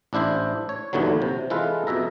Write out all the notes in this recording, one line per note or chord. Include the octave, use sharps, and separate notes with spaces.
A1 D4 E4 C5 E5
C#5
A#1 D#2 D3 E3 F#3
C3
E3 G#3 F4 A4 B4
F2 B2 E5 A#5